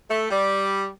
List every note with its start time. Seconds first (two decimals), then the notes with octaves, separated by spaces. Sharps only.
0.10 A3
0.31 G3